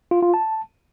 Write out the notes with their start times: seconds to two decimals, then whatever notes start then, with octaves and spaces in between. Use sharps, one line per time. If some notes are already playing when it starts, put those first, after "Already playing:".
0.11 F4
0.22 F4
0.34 A5